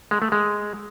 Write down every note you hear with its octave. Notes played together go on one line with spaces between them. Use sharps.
G#3
A3
G#3